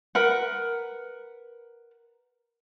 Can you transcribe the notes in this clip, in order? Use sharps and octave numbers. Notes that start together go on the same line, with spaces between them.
A#4 B4 F#5